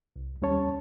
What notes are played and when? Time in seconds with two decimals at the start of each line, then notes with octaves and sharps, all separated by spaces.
0.16 C2
0.42 D#2 G3 C#4 C#5 A5